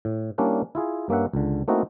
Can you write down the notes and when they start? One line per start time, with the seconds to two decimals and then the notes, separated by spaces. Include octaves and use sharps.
0.05 A2
0.38 G3 A#3 C#4 D4 E4
0.75 E4 F4 G#4
1.09 G2 A#3 C#4 E5 F#5
1.33 C#2 D3
1.68 A3 A#3 C4 D#4 E4 F#4